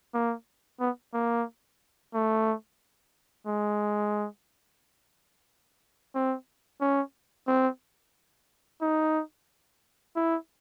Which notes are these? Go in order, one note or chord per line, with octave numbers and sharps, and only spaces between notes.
A#3
B3
A#3
A3
G#3
C4
C#4
C4
D#4
E4